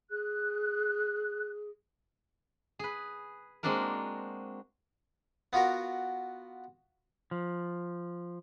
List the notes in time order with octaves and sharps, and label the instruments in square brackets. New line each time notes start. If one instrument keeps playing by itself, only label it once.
[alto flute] G#4 [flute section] F#6
[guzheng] G#4 B4
G#3 A#3 C4 D4 F#4 A#4
[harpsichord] B3 F4 F#4 A#4
[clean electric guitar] F3